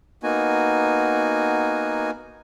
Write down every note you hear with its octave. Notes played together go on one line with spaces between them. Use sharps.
A#3 B3 D#4 F#4 G#5